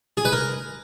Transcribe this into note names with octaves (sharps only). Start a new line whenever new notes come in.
G#4
B4
A#4